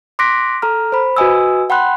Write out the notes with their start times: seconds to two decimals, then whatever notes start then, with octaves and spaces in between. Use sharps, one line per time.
0.19 C6 D6 F#6 A#6 B6 D7
0.62 A4 A#5 F6
0.92 C5 B5
1.16 F#4 B4 D#5 G#5 D#6 E6
1.70 F#5 G5 B5 C6 F#6